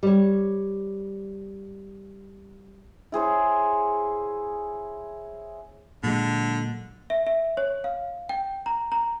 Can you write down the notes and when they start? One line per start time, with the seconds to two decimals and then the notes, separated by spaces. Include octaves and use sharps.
0.03 G3 C5 C#5
3.12 E4 G#4 C5 C#5
6.04 A#2 D3 F#3 G#3
7.10 E5
7.27 E5
7.57 C#5
7.84 F5
8.29 G5
8.66 A#5
8.92 A#5